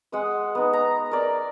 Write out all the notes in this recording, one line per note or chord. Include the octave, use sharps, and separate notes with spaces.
G#3 F#5 D#6 E6
B3 D#4
A#5
A#4 D5